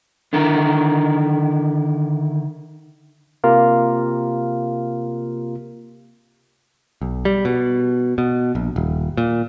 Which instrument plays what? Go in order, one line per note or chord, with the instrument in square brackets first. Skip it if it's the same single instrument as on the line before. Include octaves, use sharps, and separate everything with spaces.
[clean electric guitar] D3 D#3 E4 A#4
[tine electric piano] C3 A#3 F4 G4 A#4
[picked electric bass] B1
G3
B2
B2
A#1
D#1
A#2